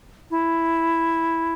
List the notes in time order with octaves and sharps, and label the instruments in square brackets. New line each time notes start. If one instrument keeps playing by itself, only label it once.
[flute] E4